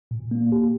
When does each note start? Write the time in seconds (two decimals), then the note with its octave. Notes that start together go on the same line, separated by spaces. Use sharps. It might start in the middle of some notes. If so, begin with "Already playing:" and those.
0.11 A#2
0.31 A#3
0.52 G4